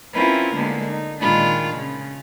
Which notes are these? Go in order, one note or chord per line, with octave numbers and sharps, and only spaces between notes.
C4 C#4 E4 F4 A#4 B4
D3 G#3 A#3 B3
D#4
A#2 D#3 G#3 D4 F4 B5
C#3